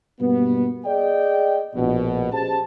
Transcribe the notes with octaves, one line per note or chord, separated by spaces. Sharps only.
G2 B2 G3 A#3 B3
G#4 D5 D#5 G5
A#1 B2
C#4 G4 G#4 C5 A5